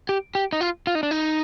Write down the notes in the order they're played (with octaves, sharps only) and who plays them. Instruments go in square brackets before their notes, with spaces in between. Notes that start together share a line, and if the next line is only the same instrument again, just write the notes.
[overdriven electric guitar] G4
G4
D#4
F4
F4
D#4
D4
D#4